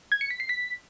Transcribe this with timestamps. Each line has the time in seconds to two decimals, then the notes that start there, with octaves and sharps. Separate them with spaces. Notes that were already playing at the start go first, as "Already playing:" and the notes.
0.12 G#6
0.21 C#7
0.30 B6
0.40 C7
0.49 B6